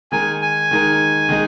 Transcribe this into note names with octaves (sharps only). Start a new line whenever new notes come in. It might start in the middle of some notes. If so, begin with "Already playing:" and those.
D#3 G#3 D#4 A#4 G#5
G#5
D#3 G#3 D#4 A#4
D#3 G#3 D#4